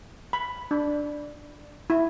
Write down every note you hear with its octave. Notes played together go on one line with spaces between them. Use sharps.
B5
D4
E4